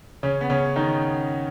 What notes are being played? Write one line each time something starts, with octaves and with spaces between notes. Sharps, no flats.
C#3 C#4
B3
C#3 C#4
D#3 D#4